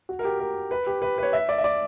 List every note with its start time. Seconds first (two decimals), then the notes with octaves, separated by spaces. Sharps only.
0.09 F#4
0.19 A#4
0.25 G4
0.39 A#4
0.71 B4
0.87 G4
1.02 B4
1.18 B4
1.23 C#5
1.33 E5
1.49 D5
1.58 E5
1.64 D5